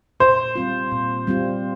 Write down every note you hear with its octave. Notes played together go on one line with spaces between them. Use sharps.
A#2 C5
G3 C4 F4
A#2
G3 C4 F4